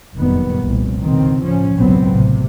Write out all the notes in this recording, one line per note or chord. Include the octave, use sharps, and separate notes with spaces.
F1 F#2 A#2 D#3 G3 B3
F1 C2 A#2
C#2 B2 D#3 C4
A2 F3 C#4
G#1 C#2 B2 F#3 B3 C4
A1 C3